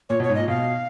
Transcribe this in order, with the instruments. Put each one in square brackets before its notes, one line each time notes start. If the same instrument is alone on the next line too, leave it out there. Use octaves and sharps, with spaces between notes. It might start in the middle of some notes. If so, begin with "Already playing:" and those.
[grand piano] A#2 [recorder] C#5
[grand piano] B2
[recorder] C#5
[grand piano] G#2
[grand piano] A#2 [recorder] D#5
[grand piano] B2 [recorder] F5